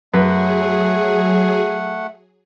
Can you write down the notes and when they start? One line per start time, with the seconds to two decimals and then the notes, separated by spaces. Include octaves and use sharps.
0.14 F#2 F#3 A3 G#4 B4 F#5